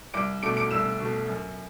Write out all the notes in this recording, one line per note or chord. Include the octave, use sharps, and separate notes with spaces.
C2 D6 D7
B2 A3 D6 D7
D6 D7
C2 E6 E7
B2 A3
F#2